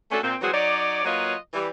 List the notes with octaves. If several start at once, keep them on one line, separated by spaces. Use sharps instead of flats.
A3 C#4 D4 F#4 A4
A#2 C4
E3 F#3 C4 F#4 G#4 C5
F#3 D#4 C#5 D5
F#3 A#3 F4 B4 C#5 D#5
E3 G3